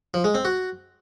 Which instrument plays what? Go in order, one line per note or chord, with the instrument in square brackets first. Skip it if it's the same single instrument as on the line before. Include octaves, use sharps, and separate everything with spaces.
[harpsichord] F3
G#3
C4
F#4